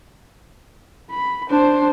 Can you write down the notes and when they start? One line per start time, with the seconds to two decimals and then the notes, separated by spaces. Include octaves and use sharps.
1.11 B5
1.50 D4 C5